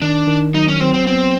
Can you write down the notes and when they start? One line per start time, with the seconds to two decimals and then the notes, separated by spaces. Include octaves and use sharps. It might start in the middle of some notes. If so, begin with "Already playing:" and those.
0.02 D#3 D4
0.28 D#3
0.54 F#3 D#4
0.68 C#4
0.80 F#3 C4
0.94 C4
1.07 B3 C4